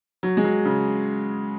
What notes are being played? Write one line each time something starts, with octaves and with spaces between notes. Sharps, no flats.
F#3
G#3
F#3
C#3